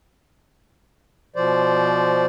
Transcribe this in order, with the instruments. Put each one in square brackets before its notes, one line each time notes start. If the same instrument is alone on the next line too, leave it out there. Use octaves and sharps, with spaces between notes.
[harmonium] B2 F3 C5 D5